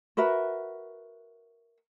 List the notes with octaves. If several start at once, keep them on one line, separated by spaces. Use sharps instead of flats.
F#4 A#4 B4 E5